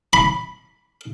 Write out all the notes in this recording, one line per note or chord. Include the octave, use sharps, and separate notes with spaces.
B5